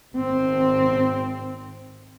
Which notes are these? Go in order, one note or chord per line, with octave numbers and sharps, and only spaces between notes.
G#1 C4